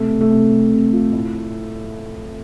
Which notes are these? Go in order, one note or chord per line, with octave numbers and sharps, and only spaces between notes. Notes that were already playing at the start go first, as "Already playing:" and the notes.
Already playing: C3 A3
C3
A3
C3
C3
C3
F3
A2